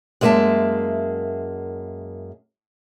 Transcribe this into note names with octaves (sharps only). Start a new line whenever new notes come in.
F#2 G#3 A#3 F#4 E5 A5